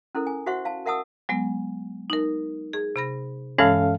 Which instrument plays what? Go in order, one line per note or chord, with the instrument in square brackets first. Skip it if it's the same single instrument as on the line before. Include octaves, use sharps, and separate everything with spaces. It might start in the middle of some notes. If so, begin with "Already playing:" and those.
[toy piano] C#4 E4 A4 A#4
G#5
F#4 C5 E5 F#5 C#6
F5 A5
A#4 E5 F#5 A5 D#6 E6
[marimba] F#3 G#3 B3
D#4 A#4
G#4
C3 B5 A#6
[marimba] G2 E3 G#3 [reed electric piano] C#4 A4 F5